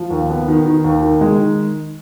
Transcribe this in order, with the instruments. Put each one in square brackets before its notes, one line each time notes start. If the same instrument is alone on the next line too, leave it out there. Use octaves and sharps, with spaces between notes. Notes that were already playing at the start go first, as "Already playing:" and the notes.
Already playing: [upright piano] F3
D#2
B3
D#3
D#3
D#2
D#3
G#3
D#3